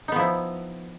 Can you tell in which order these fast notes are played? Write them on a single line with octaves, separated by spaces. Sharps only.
D#4 B3 F3 E4